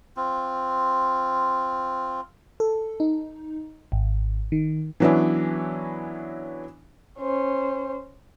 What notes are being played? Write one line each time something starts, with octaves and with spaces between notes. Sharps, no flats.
C4 F4
A4
D#4
G#1
D#3
E3 F#3 B3 C#4 D4 E4
C#4 C5